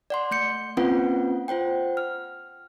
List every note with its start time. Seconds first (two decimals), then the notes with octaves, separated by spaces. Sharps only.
0.10 D5 F#5 C6
0.31 A3 G6 C#7
0.77 A#3 C4 C#4 F4 B4 F#5
1.48 F4 C5 F#5 G5
1.97 F6